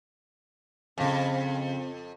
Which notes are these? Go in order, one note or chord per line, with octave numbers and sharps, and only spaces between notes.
F2 C#3 C4 F5